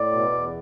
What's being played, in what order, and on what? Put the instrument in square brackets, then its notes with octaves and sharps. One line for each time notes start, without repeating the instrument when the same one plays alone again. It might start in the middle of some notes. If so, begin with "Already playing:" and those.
Already playing: [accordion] A2 D5
B2
E2